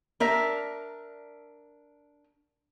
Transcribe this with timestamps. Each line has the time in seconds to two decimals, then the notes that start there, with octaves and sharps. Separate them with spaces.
0.20 D4 A#4 E5